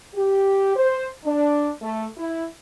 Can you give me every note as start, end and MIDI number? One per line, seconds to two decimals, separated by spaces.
0.15 0.75 67
0.76 1.06 72
1.25 1.68 62
1.82 2.05 57
2.17 2.44 64